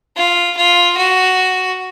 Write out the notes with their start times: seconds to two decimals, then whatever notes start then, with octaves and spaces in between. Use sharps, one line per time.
0.16 F4
0.57 F4
0.97 F#4